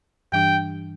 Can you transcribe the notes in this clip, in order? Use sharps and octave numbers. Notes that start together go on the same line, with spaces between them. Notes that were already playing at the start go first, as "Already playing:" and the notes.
G2 E3 G3 D4 G4 G5